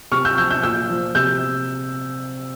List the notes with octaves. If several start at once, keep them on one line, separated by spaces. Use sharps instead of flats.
C3 C#6 F6
E6 G6
F3 E6 G6
E6 G6
A#2 E6 G6
F3
C3 E6 G6